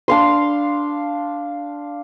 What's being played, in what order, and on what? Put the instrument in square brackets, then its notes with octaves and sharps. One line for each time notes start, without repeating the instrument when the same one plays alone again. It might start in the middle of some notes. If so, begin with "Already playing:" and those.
[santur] D4 F5 C6